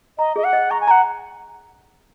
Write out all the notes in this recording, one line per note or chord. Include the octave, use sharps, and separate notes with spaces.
D#5 A#5
G#4 D#5
F#5
D#5
A#5 C#6
G#5
F#5 A#5